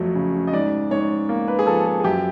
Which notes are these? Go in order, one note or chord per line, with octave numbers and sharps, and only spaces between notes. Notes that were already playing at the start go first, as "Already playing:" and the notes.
Already playing: F2 F#3 A3
C#3
D#5
G#2 D5
G#2 C#5
A#3
B4
G#4
F3 A4
G#4
G#4
F#2 G4